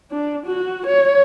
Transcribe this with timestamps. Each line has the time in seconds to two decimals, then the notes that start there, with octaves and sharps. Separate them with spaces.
0.11 D4
0.47 F#4
0.87 C#5